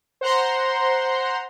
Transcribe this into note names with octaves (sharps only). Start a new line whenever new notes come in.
C5 F#5 A#5 C6